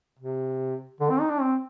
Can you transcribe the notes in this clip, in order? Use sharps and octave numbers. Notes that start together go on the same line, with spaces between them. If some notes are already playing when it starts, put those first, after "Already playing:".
C3
D3
C4
D#4
D4
C4